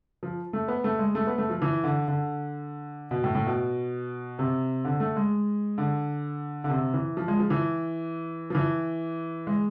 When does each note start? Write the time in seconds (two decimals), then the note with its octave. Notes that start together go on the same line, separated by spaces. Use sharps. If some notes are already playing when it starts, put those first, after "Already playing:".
0.23 F3
0.53 A3
0.68 B3
0.84 A3
0.99 G#3
1.15 A3
1.27 B3
1.38 A3
1.50 F3
1.62 E3
1.84 D3
2.08 D3
3.11 B2
3.24 A2
3.35 A2
3.46 B2
4.39 C3
4.85 D3
5.00 A3
5.16 G#3
5.78 D3
6.64 D3
6.70 C3
6.94 E3
7.17 F3
7.28 G#3
7.39 F3
7.50 E3
8.50 F3
8.55 E3
9.47 G#3